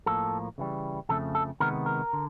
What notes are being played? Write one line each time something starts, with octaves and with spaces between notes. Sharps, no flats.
A2 F3 A#3 A4
C#3 E3 G3
F2 C#3 F3 A3 A4
A4
C3 D#3 G#3 B3 A#4
A#4
D3